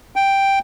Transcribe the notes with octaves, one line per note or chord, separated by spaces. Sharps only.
G5